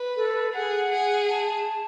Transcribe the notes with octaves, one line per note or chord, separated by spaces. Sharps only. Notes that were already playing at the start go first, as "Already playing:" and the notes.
Already playing: B4
A4
G#4 F#5
G#4
A5